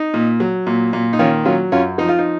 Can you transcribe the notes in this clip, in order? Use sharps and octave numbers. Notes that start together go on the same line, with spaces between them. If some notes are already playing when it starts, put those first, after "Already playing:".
Already playing: D#4
A#2
F#3
A#2
A#2
D#4
D#3 C#4 F4
F#3 C#4 F4
F#2 C#4 F4
F3 D#4
F4
D#4